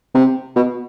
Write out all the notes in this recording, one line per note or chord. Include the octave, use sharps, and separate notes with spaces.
C3
B2